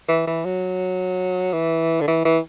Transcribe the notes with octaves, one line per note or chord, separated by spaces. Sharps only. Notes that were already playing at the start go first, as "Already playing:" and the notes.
E3
E3
F#3
E3
D3
E3
E3